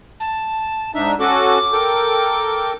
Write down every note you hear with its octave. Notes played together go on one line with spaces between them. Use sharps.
A5
G#2 D4 D#4 E5
C#4 F#4 A4 D6
A4 A#4 G5